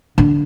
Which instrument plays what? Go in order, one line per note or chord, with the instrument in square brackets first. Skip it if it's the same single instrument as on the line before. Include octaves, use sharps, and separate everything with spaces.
[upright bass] D3